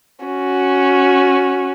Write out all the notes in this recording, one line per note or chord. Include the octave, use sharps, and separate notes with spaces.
C#4 F#4